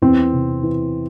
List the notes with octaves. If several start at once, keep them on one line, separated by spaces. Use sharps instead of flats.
E2 C4
C3
E3